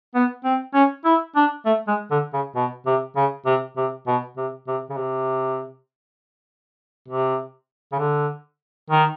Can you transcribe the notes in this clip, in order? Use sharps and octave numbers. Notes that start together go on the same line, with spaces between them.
B3
C4
C#4
E4
D4
A3
G#3
D3
C#3
B2
C3
C#3
C3
C3
B2
C3
C3
C#3
C3
C3
C#3
D3
D#3